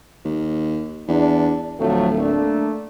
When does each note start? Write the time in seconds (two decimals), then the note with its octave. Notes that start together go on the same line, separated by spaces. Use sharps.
0.25 D#2
1.08 E2 D4
1.79 D1 F3 F#3 A3
2.17 A3 A#3 D4